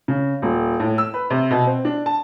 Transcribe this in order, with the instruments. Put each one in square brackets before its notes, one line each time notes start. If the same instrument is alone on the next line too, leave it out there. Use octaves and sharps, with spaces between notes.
[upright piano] C#3
D#1
A2
E6
B4
C3
B2
C4
D4
A5